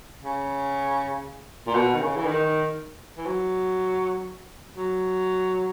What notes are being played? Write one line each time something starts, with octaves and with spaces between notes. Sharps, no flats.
C#3
A#2
B2
D#3
C#3
E3
D#3
E3
F#3
F#3